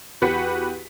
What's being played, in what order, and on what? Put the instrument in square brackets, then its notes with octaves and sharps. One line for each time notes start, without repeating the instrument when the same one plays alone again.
[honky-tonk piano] E2 F#4 G4 B4 B6 C#7